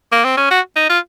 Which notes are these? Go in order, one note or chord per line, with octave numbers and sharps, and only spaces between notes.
A#3
C4
C#4
F#4
D#4
F4